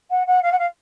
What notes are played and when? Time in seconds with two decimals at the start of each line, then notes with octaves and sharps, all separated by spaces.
0.10 F#5
0.27 F#5
0.42 F5
0.52 F#5
0.59 F5